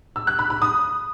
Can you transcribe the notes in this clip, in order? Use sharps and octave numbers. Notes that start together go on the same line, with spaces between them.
E6
F#6
B5
B5
D#6